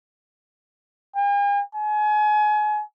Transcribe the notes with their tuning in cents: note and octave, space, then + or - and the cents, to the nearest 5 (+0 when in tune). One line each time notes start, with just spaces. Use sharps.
G#5 -45
G#5 +30